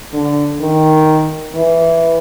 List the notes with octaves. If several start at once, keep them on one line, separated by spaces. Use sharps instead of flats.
D3
D#3
E3